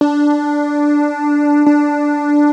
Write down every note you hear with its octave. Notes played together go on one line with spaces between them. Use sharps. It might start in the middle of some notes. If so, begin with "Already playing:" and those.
D4
D4